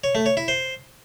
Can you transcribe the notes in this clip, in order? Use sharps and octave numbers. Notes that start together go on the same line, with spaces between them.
C#5
A3
C#5
E4
C5